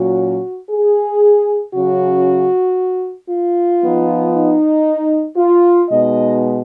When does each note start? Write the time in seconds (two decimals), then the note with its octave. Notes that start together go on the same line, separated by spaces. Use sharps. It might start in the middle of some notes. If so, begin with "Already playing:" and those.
Already playing: A#2 F#3 C#4 F#4
0.70 G#4
1.73 C#3 F#3 C#4 F#4
3.30 F4
3.82 F3 B3 D#4
4.34 D#4
5.37 F4
5.89 B2 G#3 B3 D#4 D#5